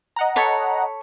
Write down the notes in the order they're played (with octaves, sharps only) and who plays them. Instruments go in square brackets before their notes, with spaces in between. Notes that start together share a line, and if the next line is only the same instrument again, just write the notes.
[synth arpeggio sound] D#5 F#5 A#5
[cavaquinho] A4 C#5 B5